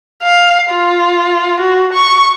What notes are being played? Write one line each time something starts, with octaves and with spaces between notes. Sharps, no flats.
F5
F4
F#4
C#6